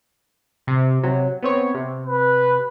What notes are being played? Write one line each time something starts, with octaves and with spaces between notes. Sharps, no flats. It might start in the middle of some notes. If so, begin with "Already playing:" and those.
C3
C3 F#3
B3 C4 C#5
C3
B4